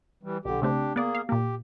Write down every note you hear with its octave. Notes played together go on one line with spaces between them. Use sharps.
E3 G3
B1 D3 G4
C#3 A3 C4 D4 G4
A#3 B3 G#4 D5
F5
A#2 A#3 G4